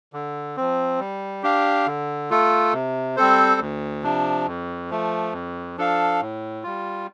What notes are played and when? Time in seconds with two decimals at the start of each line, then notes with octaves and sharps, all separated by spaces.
0.13 D3
0.57 F3 C4
0.99 G3
1.43 D4 G4 F5
1.86 D3
2.30 A3 F4 A4
2.73 C3
3.16 G3 C4 A4 C5
3.61 D2
4.03 C3 F3 D4
4.47 F2
4.90 F3 A3
5.33 F2
5.77 F3 D4 A4 F5
6.20 A2
6.63 G3 F4